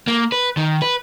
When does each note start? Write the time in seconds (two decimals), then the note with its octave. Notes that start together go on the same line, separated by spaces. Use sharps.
0.08 A#3
0.32 B4
0.57 D#3
0.82 B4